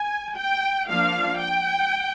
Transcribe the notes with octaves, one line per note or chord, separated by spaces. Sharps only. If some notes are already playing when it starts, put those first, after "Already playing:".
Already playing: G#5
G5
F3 A#3 D4 F5
G5